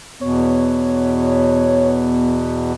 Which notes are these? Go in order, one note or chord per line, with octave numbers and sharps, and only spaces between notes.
E2 B2 B3 C#5